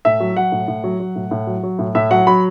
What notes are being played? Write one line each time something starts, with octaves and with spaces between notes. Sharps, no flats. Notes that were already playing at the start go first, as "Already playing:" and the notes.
A2 E5
F#3
F#3 F#5
A2
A2
F#3
F#3
A2
A2
F#3
F#3
A2
A2 E5
F#3 F#5
F#3 B5